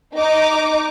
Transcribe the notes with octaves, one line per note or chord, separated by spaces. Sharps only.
D#4 D6